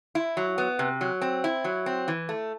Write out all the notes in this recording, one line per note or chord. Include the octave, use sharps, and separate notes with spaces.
E4
F#3
B3
C3
F#3
C4
E4
F#3
C4
E3
A3